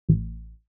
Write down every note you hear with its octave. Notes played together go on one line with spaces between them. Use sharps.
A1